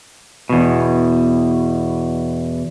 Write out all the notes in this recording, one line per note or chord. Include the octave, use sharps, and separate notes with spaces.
E2 B2